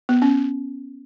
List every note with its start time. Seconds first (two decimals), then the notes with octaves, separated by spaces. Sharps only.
0.09 B3
0.22 C#4